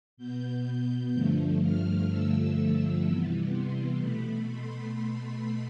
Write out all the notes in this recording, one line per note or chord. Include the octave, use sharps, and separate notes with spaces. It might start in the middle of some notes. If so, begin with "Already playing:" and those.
B2 B3 G6
G6
G2 D3 F3 A3
F6
G2 D3 F3 A3 E6
E6
C3 E3 G3 B3
C6
B2 A3 B5
C6